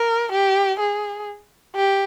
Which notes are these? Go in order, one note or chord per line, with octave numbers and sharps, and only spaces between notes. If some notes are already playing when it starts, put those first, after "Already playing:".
Already playing: A#4
G4
G#4
G4